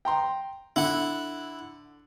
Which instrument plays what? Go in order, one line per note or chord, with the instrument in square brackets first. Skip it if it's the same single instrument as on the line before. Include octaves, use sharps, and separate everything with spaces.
[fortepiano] G5 A#5 C6
[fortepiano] D3 [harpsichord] E4 F#5